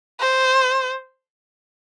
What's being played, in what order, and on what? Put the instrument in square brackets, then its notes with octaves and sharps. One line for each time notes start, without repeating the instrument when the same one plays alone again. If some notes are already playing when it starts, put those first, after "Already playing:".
[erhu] C5